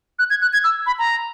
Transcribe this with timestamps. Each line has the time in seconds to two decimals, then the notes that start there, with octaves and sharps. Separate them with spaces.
0.19 F#6
0.30 G#6
0.42 F#6
0.53 G#6
0.64 E6
0.86 B5
0.99 A#5